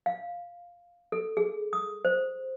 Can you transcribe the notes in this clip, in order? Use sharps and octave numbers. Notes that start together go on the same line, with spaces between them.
F5
A4
G#4
D#6
C5